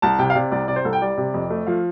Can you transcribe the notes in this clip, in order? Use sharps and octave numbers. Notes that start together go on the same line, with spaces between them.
C2 A5
C3 G5
F5
C3 D5
C2 D5
C3 D5
C5
C2 A4
G5
G3 D5
C3
F2
A3
F3 F5